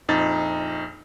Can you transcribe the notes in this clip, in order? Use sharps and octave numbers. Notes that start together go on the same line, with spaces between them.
A#1 F2 D#4 A6